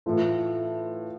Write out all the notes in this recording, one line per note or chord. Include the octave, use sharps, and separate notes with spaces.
A2 E3 A3 F4